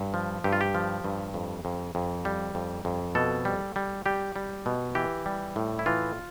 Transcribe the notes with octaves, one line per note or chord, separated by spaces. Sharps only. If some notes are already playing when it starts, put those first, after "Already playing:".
Already playing: G2
F3
G2 G4
F4
G4
F3
G2
F2
F2
F2
G3
F2
F2
B2 A4
G3
G3
G3 G4
G3
B2
E3 G4
G3
A2
E4
E3 F4